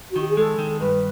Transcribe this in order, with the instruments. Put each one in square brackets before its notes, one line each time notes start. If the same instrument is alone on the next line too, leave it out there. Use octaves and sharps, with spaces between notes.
[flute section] F#4
[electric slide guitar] D#3 [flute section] G4
[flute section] G#4
[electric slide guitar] G#3 [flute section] A4
[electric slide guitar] D#3
[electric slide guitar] G2 [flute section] B4